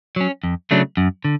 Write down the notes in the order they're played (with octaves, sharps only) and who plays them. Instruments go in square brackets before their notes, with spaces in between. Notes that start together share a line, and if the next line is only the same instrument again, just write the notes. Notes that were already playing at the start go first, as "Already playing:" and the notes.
[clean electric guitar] F#3 C#4
F2
C#3 F#3 A3 D4
F#2
D3